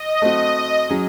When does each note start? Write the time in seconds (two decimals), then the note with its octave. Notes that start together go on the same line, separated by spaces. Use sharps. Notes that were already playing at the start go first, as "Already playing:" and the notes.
Already playing: D#5
0.22 A3 C4 F#4
0.90 F#3 C#4 G#4